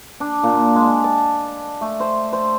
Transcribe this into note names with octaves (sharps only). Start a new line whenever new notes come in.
D4
A#2
G#3
A5
A3
C5
C5